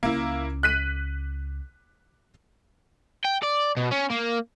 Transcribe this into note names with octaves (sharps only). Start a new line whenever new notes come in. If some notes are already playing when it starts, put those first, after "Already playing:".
C#2 A#3 E4
F#6 B6 D#7
G5
D5
B2
C#4
A#3